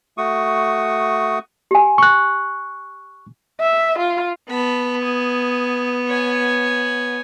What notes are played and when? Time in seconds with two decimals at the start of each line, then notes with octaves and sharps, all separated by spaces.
0.18 A3 F#4 C#6 D#6
1.71 G4 G#5
1.98 C#6 F#6
3.61 E5
3.99 F4
4.50 B3 A5 B5
5.02 G#5 D#6
6.06 C#5 G#5